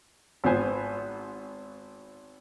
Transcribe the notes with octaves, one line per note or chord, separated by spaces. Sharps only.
G#1 B3 F4 B4 C5 G#5